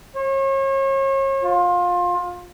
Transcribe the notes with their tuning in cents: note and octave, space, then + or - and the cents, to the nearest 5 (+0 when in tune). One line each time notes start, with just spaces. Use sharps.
C#5 -35
F4 +25